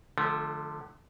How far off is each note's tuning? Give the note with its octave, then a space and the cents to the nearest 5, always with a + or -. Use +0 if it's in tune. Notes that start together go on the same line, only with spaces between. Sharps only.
D3 +20 F3 +0 A3 -25